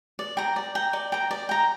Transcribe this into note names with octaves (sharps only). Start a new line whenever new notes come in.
D5
G5 A#5
D5
G5 A#5
D5
G5 A#5
D5
G5 A#5